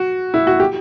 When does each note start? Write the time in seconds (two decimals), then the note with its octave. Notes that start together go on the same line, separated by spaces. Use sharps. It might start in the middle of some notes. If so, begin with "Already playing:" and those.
Already playing: F#4
0.34 E4
0.47 F#4
0.60 G4